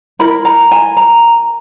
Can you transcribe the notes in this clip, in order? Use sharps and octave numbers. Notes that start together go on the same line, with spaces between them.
E4 A#4 B5
A#5
G#5
A#5